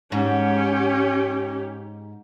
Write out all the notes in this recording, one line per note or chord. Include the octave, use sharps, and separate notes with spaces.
G#2 C#4 G4